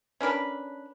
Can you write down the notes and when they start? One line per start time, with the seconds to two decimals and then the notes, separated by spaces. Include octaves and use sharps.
0.21 C#4 D4 A#4 B4